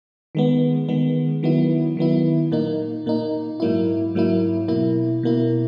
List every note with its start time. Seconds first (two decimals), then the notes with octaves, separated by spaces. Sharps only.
0.35 D#3 G#3 B3
0.88 D#3 G#3 B3
1.43 D#3 F#3 B3 E4
1.97 D#3 F#3 B3 E4
2.52 A#2 A#3 D#4
3.06 A#2 A#3 D#4
3.60 G#2 F#3 A#3 E4
4.15 G#2 F#3 A#3 E4
4.68 B2 A#3 E4
5.23 B2 A#3 E4